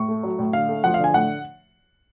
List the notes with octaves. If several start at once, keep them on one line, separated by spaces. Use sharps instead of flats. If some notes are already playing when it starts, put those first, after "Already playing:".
Already playing: A2 C#6
A3
F#3
A2
D3 F5
A3
F3 F#5
F5
D3
G#5
A2 F#5